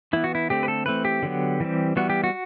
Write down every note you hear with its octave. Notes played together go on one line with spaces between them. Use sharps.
E3 B3 E4
F#4
E4
D3 A3 C4 G4
B4
A4
E3 A3 C4 B4
G4
D3 F#3 B3
E3 G3 C4
E3 G3 B3 F#4
G4
F#4